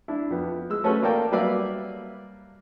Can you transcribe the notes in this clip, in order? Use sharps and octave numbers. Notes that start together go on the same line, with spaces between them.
D4 E4
F2 B3
G#3 E6
A3 C#4 F#4 A4 B4
A#3 A#4 D5 G5 A5
F#3 G3 A#3 B4 D5 E5